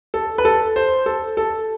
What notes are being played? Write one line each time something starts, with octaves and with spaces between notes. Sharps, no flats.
A4
B4
A4
C5
A4
A4